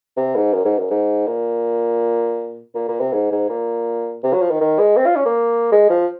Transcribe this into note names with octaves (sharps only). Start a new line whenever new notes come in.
C3
G#2
F#2
G#2
F#2
G#2
A#2
A#2
A#2
C3
G#2
G#2
A#2
C3
F#3
F3
D#3
D#3
G#3
C4
F4
C#4
A#3
G#3
F3